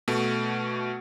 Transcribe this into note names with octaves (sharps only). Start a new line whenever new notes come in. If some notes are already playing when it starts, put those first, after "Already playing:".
B2 A3